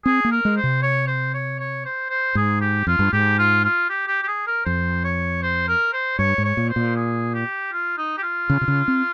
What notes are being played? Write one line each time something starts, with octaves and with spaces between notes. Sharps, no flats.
C4 G#4
A#3
A#4
G#3
C5
C3
C#5
C5
C#5
C#5
C5
C5
G#2 G#4
G4
F2 F4
G2
G#2 G4
F4
F4
G4
G4
G4
G#4
A#4
F2 C5
C#5
C5
A#4
C5
G2 C#5
G#2
C#5
A#2
C5
A#2
G#4
G4
F4
D#4
G4
F4
C#3
C3
C#3
C4